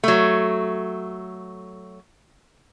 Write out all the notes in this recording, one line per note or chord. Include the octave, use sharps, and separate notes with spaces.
F#3 A3